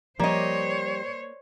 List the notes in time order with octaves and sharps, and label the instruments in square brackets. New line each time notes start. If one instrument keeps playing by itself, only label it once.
[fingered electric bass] F3 [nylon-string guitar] G3 [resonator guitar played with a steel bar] A#3 D#5 [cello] C5 C#5